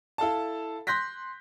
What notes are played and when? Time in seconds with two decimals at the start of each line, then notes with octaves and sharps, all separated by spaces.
0.18 E4 A4 F5 A5
0.87 C6 F#6 G6 A#6 B6